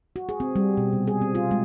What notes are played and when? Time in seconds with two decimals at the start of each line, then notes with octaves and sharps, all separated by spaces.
0.16 F#4
0.29 G#4
0.40 C4
0.56 G3
0.77 B2
0.93 C3
1.07 G#4
1.22 C4
1.35 F4
1.51 G#3